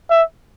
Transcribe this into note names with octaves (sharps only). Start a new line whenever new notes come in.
E5